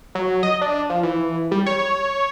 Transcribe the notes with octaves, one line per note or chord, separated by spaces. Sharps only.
F#3
D#5
D4
F3
E3
G3
C#5